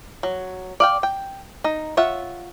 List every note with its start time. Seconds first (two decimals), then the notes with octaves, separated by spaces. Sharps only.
0.23 F#3
0.80 D5 F5 G5
1.03 G5
1.64 D#4
1.97 F4 C#5 E5 F#5